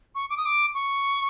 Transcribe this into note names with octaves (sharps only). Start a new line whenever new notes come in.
C#6
D6
D#6
D6
C#6